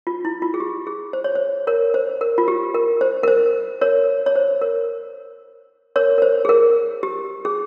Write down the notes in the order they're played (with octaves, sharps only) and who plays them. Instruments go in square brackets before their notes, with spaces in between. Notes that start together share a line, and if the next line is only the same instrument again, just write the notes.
[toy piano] F4
E4
F4
G#4
G4
G#4
C5
C#5
C5
A#4 C#5
C5
A#4
F4
G4
A#4
C5
A#4
C5
A#4 C#5
C#5
C5
A#4
A#4 C#5
A#4
C5
G#4
A#4
G4
G#4